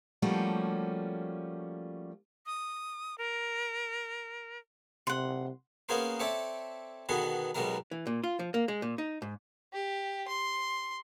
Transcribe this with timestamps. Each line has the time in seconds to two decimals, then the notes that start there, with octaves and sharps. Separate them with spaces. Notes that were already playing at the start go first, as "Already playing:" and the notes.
0.22 F3 G3 A3 A#3 C#4 F#4
2.46 D#6
3.18 A#4
5.07 C3 F#5 C6
5.89 A#3 B3 C#4 G#4 A#4 C5
6.20 C4 A4 C#5 D5 E5
7.09 B2 D3 D#3 B3 G#4
7.55 B1 B2 G3 G#3 A#4 A#5
7.91 E3
8.07 A#2
8.24 F4
8.39 F3
8.54 A#3
8.68 G#3
8.82 A#2
8.98 D#4
9.22 G#2
9.73 G4
10.28 C6